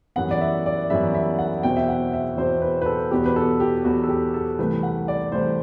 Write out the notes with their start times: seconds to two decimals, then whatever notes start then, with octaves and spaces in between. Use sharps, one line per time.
0.16 F#2 E3 G3 B3 F#5
0.31 D5
0.41 E5
0.66 D5
0.90 F#2 E3 G3 B3 E5
1.14 E5
1.39 F#5
1.63 E2 B2 F#3 C4 G5
1.76 E5
1.88 F#5
2.13 E5
2.37 E2 B2 F#3 C4 C5
2.62 B4
2.82 B4
2.86 A4
3.11 E2 B2 F#3 B3 G4
3.26 B4
3.36 A4
3.60 G4
3.84 E2 B2 F#3 B3 F#4
4.04 A4
4.09 G4
4.34 A4
4.59 C2 C3 E3 A3 B4
4.83 F#5
5.08 D5
5.32 C2 C3 E3 A3 C5